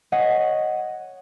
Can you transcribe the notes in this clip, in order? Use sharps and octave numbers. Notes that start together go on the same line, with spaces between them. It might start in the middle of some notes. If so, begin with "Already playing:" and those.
C#5 D#5 F#5